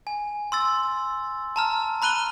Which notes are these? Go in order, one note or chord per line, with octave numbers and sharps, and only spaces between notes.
G#5
C6 E6 A6
A5 A#5 F6
A#5 B5 F#6 D#7 G7